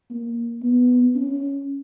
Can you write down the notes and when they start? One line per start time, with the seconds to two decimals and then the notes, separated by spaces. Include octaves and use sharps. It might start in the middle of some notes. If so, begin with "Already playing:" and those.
0.11 A#3
0.63 B3
1.16 C#4